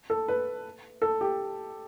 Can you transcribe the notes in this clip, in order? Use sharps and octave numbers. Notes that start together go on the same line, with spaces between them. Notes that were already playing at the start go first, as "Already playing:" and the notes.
A4
B4
A4
G4